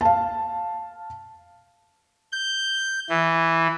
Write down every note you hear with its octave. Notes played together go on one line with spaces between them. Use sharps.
F5 A5
G6
E3